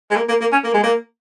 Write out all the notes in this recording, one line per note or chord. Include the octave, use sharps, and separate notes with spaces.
G#3
A#3
A#3
A#3
C#4
A#3
G#3
A#3